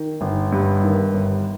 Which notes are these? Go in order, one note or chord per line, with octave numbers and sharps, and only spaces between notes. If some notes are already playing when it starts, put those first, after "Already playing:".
Already playing: D#3
G1
G2
D#3
G1